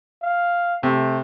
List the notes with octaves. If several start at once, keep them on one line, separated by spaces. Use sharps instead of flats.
F5
C3 A3